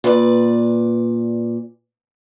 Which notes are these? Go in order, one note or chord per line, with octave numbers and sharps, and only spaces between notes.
A#2 B4 D5